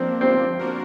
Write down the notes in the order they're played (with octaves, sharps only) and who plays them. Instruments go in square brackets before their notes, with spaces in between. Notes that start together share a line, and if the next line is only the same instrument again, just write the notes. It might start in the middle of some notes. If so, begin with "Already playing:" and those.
Already playing: [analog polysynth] F3 A#3 D4 [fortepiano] C4
[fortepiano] C4
[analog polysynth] A#3 D4 F#4 A#4